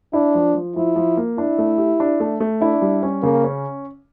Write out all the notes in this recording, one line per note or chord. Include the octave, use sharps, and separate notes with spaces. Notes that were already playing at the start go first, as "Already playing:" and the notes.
D4 E4
F3
F3
F3 E4
F3
A#3
D4 E4
A3
G4
D4
A3
A3
D4 E4
G3
C#4
C#3 A#3
C#4